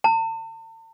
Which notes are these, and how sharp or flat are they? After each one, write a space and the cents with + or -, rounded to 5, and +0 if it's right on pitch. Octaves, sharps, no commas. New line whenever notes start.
A5 +45